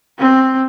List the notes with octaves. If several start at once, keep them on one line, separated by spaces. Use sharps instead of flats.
C4